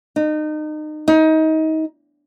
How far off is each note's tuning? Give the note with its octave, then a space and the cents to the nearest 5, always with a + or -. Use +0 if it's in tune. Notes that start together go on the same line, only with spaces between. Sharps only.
D#4 -30
D#4 +25